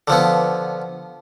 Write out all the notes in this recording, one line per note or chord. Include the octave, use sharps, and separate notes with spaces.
D3 F3 B3